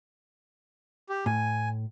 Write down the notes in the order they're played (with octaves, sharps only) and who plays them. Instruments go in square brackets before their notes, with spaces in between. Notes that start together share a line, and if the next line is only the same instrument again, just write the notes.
[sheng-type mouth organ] G4
[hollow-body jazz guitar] A2 [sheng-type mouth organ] G#5